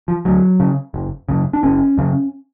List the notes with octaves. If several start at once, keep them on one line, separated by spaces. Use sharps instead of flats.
F3
D2 F#3
C#3
F#1
F#2 C#3
D4
F#1 C#4
F#2 C#3